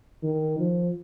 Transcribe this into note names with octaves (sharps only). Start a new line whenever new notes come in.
D#3
F3